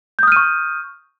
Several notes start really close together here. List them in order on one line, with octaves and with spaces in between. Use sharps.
G6 D#6 F6 D#7 C#6